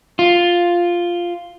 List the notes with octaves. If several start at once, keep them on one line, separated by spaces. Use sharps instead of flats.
F4